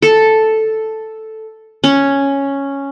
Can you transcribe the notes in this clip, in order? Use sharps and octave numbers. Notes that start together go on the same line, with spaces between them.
A4
C#4